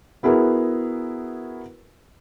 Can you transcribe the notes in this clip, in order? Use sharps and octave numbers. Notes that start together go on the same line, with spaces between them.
B3 E4 F#4 G#4 A#4 B4